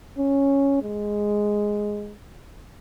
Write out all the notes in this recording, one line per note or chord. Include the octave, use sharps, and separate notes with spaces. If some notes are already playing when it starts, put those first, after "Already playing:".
C#4
G#3